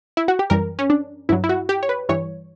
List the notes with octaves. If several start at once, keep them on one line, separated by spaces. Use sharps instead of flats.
E4
F#4
G4
F#2 E3 G3 A#4
C#4
D4
G2 F#3 E4
E4
F#4
G4
C#5
B4
G2 E3 G3 C#5